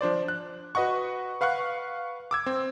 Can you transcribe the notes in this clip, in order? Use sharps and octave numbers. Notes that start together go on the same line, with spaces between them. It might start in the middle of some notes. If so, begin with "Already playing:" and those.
F3 D4 C5 D5
F#6
F#4 B4 D#5 F#5 C#6
B4 F5 F#5 C#6 F#6
D6 E6 G#6
C4